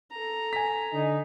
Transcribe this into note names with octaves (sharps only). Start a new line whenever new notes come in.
A4 A#5
G#5 B6
D3 D#4